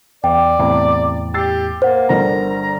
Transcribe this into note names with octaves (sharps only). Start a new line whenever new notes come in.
E2 D5 G5
E2 A2 C3
G4 E6 A6 C7
A#3 C5 F#5
G1 G2 A#4 A#5